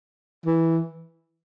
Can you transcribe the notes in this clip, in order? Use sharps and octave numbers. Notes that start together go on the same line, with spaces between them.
E3